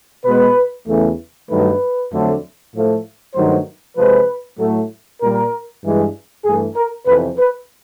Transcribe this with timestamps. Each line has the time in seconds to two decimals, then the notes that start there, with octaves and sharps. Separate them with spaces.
0.25 B2 G#3 B4
0.87 E2 C#3 E3 A3
1.48 G2 D#3 F#3 A3 B4
2.11 F2 D3 F#3 A3
2.73 A2 F3 A3
3.34 G2 D#3 F#3 A3 C5
3.97 C3 F3 G#3 B4
4.59 A2 F#3 A3
5.20 A#2 G3 A#4
5.82 G2 E3 G#3
6.44 G2 E3 A3 G#4
6.75 A#4
7.06 F2 C3 E3 B4
7.38 B4